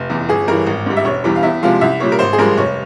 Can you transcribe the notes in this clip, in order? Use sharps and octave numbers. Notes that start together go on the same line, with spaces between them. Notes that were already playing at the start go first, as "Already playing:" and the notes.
Already playing: F1
E2 E3
G1 G#4
G2 E3 A#4
G#1
G#2 G3
E5
E1 C#5
E2 E3 G3
F5
E2 E5
C3 F3 G#3 F5
C2 E5
A#2 G3 C#5
A#4
G#1 C5
G#4
G2 F3 G#3 A#4
F1 C#5